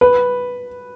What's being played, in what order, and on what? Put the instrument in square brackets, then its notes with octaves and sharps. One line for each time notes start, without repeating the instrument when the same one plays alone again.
[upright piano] B4